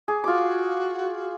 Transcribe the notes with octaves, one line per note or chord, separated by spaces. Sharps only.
G#4 D6
F4 F#4 D6